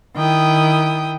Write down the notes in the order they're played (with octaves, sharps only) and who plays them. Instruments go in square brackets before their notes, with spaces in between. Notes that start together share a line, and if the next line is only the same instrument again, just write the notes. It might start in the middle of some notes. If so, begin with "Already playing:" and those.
[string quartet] D#3 E4 G5 D#6